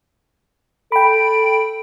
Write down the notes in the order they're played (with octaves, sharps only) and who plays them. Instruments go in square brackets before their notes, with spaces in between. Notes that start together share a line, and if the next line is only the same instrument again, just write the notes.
[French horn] A4 [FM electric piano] G5 B5 [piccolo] D7